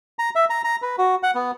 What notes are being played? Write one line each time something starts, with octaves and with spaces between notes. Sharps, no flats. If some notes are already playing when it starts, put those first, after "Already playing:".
A#5
E5
A#5
A#5
B4
F#4
F#5
B3